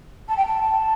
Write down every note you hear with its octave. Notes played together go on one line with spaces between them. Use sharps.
A5
G5
A5